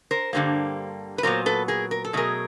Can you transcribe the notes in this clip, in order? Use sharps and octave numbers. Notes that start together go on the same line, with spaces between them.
A#4 C5
G2 D3 G3 A#3
B4
A#2 F#3 B3 A#4 C5
A4 B4
G#4 A#4
A#4
A4
B2 F#3 A3 G#4 A#4